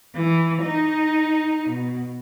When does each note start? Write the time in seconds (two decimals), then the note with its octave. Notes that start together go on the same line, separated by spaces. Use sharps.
0.15 E3
0.62 D#4
1.68 B2